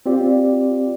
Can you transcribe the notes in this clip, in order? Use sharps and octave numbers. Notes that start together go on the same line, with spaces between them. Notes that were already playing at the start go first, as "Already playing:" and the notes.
C4 F4 G4 D5